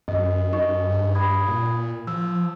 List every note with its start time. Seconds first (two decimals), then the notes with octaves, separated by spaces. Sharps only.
0.08 F#2 D#5
0.53 D#4 D#5 C#6
0.89 G2
1.15 B5 D#6 G#6
1.47 A#2
2.07 F3 E6